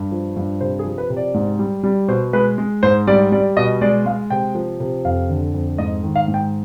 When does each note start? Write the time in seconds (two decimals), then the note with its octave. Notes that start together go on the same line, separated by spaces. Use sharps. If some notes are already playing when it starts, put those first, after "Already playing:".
Already playing: G2
0.12 F3
0.36 G2
0.61 C3 C5
0.79 G#4
0.85 F3
0.98 B4
1.10 C3
1.16 D5
1.34 G#2
1.59 G3
1.84 G3
2.08 B2 C5
2.33 G#3 B4
2.58 G#3
2.83 G#2 C5
3.07 G3 D5
3.32 G3 D5
3.57 B2 D#5
3.81 G#3 D5
4.06 G#3 F5
4.30 C3 G5
4.55 F3
4.80 C3
5.05 F2 F5
5.29 D3
5.54 F2
5.78 G#2 D#5
6.03 D#3
6.15 F5
6.28 G#2
6.34 G5